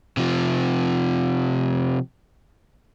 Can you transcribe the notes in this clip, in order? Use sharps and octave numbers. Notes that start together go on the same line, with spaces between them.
C3 F3